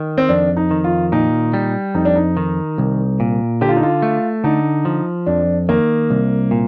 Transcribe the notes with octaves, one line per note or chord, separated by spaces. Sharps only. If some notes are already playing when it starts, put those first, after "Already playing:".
Already playing: D#3
C4
F2 D4
D#4
D#3
F4
A#2 D#4
G3
F2 D#4
D4
D#4
D#3
C2
A#2
D3 G4
F4
D#4
F4
A3
D3 D#4
F3
F2 D4
D#3 A#3
C2
A#2